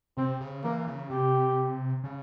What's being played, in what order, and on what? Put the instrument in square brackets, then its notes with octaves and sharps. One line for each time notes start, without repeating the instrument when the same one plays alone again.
[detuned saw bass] C3 [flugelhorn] C4
[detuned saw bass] C#3
[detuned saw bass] E3 [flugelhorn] A#3
[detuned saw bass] C#3
[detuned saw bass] C3 [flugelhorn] G4
[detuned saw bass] C#3